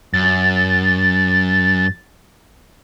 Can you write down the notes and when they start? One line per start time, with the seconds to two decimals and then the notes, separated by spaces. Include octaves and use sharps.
0.14 F#2 A6